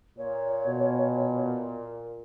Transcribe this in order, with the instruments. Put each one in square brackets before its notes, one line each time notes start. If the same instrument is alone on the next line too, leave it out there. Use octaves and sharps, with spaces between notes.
[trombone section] A#2 [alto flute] C#5
[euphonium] B2